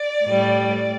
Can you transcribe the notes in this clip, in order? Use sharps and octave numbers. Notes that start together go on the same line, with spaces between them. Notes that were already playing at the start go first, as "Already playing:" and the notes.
Already playing: D5
A2 G3